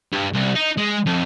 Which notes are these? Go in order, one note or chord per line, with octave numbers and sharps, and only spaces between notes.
G2
C2
D#4
G#3
F2